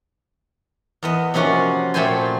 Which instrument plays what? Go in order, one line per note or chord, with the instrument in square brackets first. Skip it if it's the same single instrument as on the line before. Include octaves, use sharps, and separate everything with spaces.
[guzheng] E2 B3 D#5
C3 F3 A#3 C#4 F4 F#4
A#2 A3 C4 C5 G#5 C6